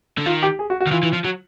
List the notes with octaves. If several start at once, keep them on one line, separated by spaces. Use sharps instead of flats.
D3
D#3 F4
G4
G#4
F#4
F#4
D#3
E3 F4
E3
F3
F#3